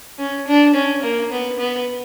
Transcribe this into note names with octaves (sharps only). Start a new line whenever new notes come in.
C#4
D4
C#4
A#3
B3
B3